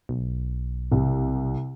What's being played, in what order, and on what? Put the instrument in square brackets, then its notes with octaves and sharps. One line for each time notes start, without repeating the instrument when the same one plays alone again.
[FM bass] B1
[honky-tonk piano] C2